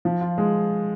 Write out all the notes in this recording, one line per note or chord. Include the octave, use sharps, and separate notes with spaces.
F3
F4
G#3